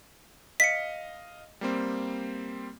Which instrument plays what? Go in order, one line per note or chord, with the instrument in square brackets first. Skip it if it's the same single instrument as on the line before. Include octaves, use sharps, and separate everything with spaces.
[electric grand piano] D#5 F5 [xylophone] B6 C#7
[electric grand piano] G3 A#3 C4